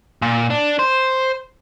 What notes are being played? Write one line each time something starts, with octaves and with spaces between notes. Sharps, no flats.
A#2
D4
C5